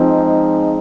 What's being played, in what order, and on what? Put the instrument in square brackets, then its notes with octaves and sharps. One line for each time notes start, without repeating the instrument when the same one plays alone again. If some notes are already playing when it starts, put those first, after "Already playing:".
Already playing: [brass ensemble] F3 G#3 D#4 [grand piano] C4